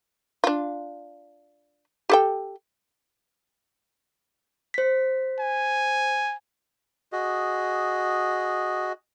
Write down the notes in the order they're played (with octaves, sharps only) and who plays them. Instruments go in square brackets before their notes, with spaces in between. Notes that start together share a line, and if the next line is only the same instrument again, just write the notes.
[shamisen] D4 F4
G4 A4 G5
[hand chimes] C5 B6
[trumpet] G#5
[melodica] F#4 G#4 D#5